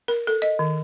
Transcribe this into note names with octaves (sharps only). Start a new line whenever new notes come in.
A#4
A4
D#5
D#3